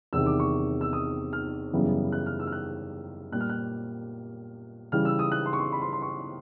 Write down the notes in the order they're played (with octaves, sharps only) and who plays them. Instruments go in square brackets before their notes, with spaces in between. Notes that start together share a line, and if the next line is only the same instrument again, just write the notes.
[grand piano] E2 C3 D#3 E6
D6
C#6
E6
D#6
F6
F#2 C#3 E3 G3 B3
F#6
F6
E6
F6
F#6
A#2 G3 A#3 F#6
F6
F#6
C#3 E3 G3 F6
E6
D#6
F#6
C6
C#6
C6
B5
C6
C6
C#6